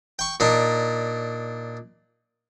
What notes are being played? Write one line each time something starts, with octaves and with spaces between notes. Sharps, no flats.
G5 C#6
A#2 D4 D#4